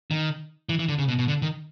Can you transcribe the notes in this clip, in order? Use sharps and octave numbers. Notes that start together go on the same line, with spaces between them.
D#3
E3
E3
D3
C#3
B2
B2
D3
D#3